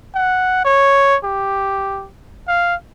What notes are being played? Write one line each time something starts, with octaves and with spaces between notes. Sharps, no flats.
F#5
C#5
G4
F5